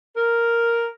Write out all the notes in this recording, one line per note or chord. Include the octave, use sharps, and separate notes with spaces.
A#4